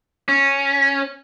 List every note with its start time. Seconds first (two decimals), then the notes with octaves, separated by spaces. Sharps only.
0.28 C#4